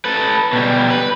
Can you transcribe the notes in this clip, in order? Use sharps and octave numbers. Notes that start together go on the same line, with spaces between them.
A4 B4
B2 G3
B4